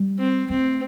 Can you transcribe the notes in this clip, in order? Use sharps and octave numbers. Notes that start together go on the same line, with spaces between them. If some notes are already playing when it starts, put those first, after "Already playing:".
Already playing: G3
C4
A3 C4